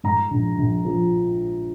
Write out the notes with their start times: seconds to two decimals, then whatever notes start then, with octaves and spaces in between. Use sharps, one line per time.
0.03 G#2 A#5
0.31 A#1
0.58 A#1
0.85 F3